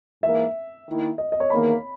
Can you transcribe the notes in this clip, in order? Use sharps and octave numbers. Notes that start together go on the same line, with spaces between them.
G#2 E3 A#3 E5
D#3 A#3 E4
D#5
D#5
C#5
E2 D#3 A#3 B5